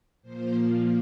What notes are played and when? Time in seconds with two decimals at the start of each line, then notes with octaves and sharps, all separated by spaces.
0.22 A#2 F3 A#3 C5